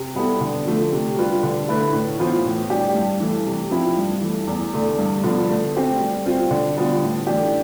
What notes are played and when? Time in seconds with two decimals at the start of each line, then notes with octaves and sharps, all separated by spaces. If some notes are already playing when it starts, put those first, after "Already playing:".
Already playing: C3
0.15 G3 B3 E4 A4
0.41 D3
0.66 F3 A3
0.92 C3
1.16 G3 D4 F4 B4
1.43 D3
1.68 A3 E4 B4
1.93 A2
2.19 E3 B3 F4 C5
2.45 A2
2.70 G3 D4 G4
2.95 G2
3.20 E3 A3
3.46 C3
3.71 F3 C4 E4
3.97 G2
4.22 E3 A3
4.47 E2
4.74 D3 A3
4.98 G2
5.24 D3 F3 B3 D4
5.49 A3
5.75 C4 G4 C5
6.00 G3
6.26 C4 F4 C5
6.51 D3
6.76 G3 B3 F4
7.02 A2
7.27 E3 A3 D4 G4